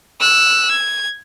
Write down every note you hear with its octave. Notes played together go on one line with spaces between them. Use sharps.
E6 F#6
G#6